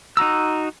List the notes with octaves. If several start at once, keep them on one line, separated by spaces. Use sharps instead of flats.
D#4 F#4 A#5 E6